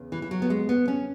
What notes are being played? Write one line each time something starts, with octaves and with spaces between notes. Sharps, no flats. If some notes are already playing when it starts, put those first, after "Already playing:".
Already playing: E2 C#3
E3
E3
F#3
B3
G#3
B3
C#4